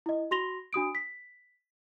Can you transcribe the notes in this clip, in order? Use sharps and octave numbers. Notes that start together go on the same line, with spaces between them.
E4 D#5
F#4 C6 A#6 F7 G7
D4 F#4 D#6 D7
B6